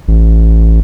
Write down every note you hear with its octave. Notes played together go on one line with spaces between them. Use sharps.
A1